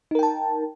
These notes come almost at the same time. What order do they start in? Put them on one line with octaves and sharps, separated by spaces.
D#4 A#4 G5 A5